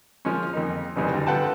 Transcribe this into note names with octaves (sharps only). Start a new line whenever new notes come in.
F3 G#3 A#3 C#4
F2 A#3 D#4
C2 F2 G#2 C#3 E3 G3
D2 G2
F4 A4 B4 F#5 G5 A5